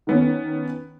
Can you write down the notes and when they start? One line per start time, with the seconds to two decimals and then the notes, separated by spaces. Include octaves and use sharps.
0.07 D#3 B3 C#4